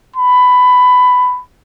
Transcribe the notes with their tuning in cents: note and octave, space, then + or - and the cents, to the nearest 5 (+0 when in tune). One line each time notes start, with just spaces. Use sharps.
B5 +15